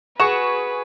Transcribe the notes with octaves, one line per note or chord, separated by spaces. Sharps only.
F#4 G#4 B4 C#6 E7